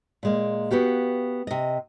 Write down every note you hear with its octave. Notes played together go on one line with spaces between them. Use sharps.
A#2 G#3 A#3
B3 F#4 G4 F5
C3 D#5